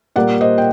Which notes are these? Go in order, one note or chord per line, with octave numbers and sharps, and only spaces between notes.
A#2 G3 A#3 D5 F#5
C5 D#5
G5